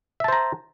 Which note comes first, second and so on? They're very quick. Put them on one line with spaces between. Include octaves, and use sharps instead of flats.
E5 A5 C5 A#5